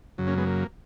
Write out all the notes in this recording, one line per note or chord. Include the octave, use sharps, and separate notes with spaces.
F#2 C#3 F#3
A#3 C#4
G#3 B3
A#3